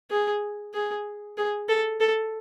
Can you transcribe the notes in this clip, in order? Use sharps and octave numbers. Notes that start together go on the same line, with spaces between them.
G#4
G#4
G#4
A4
A4